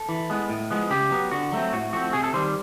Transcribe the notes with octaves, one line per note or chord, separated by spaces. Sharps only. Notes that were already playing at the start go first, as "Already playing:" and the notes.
Already playing: A4
E3
G#3 B3
A2
F3 G#3 B3
C#3 G4
F#3 B3
D3 F#4
F#3 A3 C4
A2 F#4
F3 A3 C4 F#4
C3 G#4
A4
D#3 G3 C5